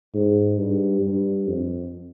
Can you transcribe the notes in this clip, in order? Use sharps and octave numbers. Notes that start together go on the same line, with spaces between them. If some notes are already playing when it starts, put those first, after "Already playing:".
G#2
G2
G2
F2